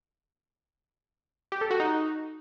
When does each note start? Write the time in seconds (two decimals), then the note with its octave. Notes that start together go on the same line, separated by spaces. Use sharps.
1.52 G4
1.61 A4
1.71 F#4
1.80 D#4